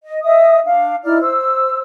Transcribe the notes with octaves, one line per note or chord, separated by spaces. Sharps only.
D#5
D#5 E5 D#6
D4 F5
D#4 E4 D5 F6
C5 E6